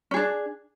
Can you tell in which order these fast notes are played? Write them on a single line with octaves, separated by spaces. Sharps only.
C#4 G#4 D4